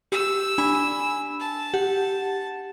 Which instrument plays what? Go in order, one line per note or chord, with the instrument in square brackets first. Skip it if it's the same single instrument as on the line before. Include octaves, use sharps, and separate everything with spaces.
[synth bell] G4 [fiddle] E6
[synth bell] D4 G#5 B5
[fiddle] A5
[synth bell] G4 F#5